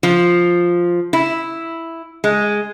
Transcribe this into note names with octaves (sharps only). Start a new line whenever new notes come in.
F3
E4
G#3